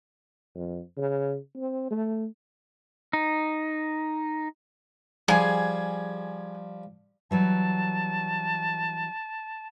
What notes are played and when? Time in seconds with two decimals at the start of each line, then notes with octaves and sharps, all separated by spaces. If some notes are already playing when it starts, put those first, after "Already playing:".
0.55 F2
0.97 C#3
1.56 C4
1.91 A3
3.13 D#4
5.28 F3 G3 G#4
7.31 E3 F#3 G3 A5